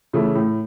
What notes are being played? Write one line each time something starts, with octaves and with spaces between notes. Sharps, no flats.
C#3 E3 A3 E4
A2